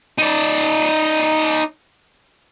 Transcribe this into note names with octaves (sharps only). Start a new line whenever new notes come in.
D#4 D5